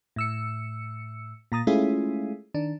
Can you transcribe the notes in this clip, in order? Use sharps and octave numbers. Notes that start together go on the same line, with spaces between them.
A2 E6 C#7
A#2 A#5 D#6 A6
G#3 A3 C#4 E4 F4 G#4
D#3 D4